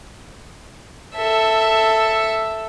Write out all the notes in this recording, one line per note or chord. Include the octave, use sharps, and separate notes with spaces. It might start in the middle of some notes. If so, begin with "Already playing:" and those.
A4 E5